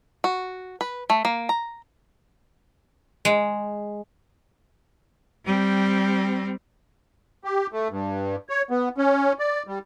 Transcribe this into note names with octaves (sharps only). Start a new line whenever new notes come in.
F#4
B4
A3
A#3
A#5
G#3
G3 C4
G4
A3
G2
C#5
B3
C#4
D5
G3